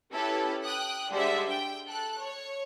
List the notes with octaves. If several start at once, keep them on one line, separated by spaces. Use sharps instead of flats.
C#4 E4 G4 A4 B4
G5 D#6 F#6
D3 G3 G#3 C5 E5
G5
A4 F#6
C#5